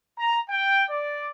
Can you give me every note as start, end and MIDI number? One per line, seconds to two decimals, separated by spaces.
0.17 0.38 82
0.49 0.82 79
0.89 1.29 74